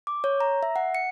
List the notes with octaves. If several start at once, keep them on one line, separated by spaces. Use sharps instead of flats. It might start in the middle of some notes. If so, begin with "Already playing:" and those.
D6
C#5
A#5
E5
F#5
C#7